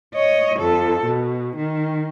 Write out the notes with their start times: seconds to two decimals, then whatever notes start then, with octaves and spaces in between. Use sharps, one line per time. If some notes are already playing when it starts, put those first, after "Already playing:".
0.14 C#5 D#5
0.60 F2 A4
1.05 B2
1.56 D#3